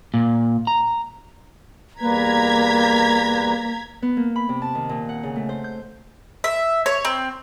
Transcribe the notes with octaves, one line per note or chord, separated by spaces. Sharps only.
A#2
A#5
E2 G3 A#3 B4 A#5 G#6 B6
B3
A#3
B5
C3
A5
D#3
A#2
F#5
C#3
A3
C5
G6
E5
C#5
C4